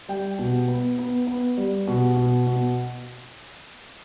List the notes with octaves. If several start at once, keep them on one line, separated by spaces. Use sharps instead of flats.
G3 G5
B2
B3
B3
B3
G3
B2
B2
B2